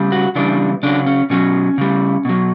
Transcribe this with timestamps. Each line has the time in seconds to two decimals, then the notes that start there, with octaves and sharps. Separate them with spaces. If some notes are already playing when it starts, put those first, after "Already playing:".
Already playing: C#3 G3
0.12 F#4
0.35 C#3 E3 G3 D4
0.83 C#3 F#3 D4
1.07 C#4
1.30 B2 F#3 C#4
1.78 C#3 G3
2.25 B2 F#3